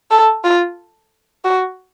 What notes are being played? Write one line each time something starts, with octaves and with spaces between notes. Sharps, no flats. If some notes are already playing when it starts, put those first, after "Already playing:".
A4
F4
F#4